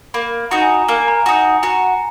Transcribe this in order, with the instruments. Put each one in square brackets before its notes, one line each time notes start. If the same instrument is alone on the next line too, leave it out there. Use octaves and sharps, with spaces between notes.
[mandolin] A#3 [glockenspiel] B5
[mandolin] D#4 F#4 [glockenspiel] A#5
[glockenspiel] G#5
A#5
[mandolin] A#3 [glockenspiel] A#5
[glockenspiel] G#5
A#5
[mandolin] D#4 F#4 [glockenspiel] G#5
[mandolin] F#4 [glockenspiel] A#5